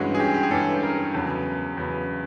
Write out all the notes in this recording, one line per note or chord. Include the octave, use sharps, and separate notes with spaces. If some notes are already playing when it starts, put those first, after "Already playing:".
Already playing: G2 E3 G#3 C#4 F#4
G#4
G4
G4
G#4
G2 E3 G#3 C#4 A4
A#4
E2 C#3 F#3 B3 A4
E2 C#3 F#3 B3